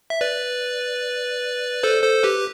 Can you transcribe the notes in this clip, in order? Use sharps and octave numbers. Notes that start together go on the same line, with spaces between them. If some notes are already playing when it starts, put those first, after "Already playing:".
E5
B4 D5
A4 C5
A4 C5
G4 B4